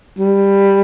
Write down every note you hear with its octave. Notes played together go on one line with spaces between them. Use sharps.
G3